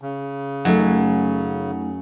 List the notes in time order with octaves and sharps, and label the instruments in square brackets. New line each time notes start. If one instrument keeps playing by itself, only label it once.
[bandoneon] C#3
[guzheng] F#2 [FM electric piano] A3 D#4 F#5